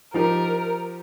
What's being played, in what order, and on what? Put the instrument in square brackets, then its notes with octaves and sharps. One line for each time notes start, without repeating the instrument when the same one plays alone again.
[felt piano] F3 D#4 G4 [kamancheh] A#4